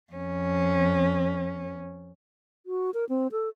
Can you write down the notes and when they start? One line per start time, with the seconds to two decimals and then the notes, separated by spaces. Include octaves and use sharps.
0.13 F2 C#4
2.66 F#4
2.94 A#4
3.09 C4
3.32 A4